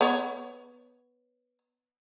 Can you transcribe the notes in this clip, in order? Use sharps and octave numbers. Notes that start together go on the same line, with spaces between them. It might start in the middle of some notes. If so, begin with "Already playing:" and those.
B3 C#5